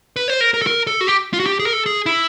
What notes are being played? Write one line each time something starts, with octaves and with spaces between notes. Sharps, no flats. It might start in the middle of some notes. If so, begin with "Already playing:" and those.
B4
C5
A#4
A#4
A4
A#4
A4
F#4
G4
F4
F#4
G4
G#4
A#4
A4
G#4
E4